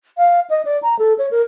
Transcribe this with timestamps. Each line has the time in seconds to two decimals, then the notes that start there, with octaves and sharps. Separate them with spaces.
0.18 F5
0.50 D#5
0.65 D5
0.83 A#5
0.99 A4
1.18 C#5
1.31 A#4